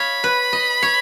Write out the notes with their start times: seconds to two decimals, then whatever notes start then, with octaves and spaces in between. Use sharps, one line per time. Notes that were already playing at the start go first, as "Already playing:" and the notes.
Already playing: C#5 D#5 F5 B5
0.24 B4
0.53 D#5
0.83 C#5